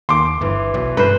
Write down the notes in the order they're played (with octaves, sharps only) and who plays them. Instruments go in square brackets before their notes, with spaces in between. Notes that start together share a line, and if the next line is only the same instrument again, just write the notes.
[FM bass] D#2 [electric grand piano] C6 D6
[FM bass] G1 [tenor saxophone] E3
[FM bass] B1
[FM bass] G2 [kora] B4 C5